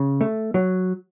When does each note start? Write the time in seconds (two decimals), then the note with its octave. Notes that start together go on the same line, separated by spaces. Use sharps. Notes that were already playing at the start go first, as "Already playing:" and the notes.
Already playing: C#3
0.21 A3
0.54 F#3